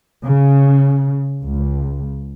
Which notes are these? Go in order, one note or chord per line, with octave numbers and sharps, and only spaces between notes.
C#3
C#2